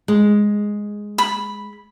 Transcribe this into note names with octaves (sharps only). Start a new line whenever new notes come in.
G#3
B5